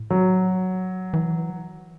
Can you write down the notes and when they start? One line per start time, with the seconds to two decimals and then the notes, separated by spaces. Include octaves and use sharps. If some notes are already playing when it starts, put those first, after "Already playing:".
Already playing: A2
0.10 F#3
1.14 E3